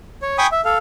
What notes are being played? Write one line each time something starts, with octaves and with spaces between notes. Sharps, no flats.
C#5
G5 G#5 B5 C#6 D#6
E5
A4 F5